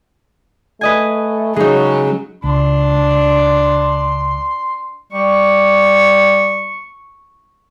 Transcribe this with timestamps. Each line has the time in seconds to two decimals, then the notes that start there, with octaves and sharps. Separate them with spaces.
0.81 A3 B4 D#5 G#5
1.56 C#3 F#3 G#3 D#4
2.44 C#2 D4 C6
5.12 G3 C#6